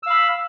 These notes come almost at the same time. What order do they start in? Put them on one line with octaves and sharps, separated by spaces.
E6 F5 B5